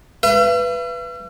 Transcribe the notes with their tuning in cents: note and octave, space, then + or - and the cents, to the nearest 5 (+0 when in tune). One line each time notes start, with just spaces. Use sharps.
B4 +0 E5 +45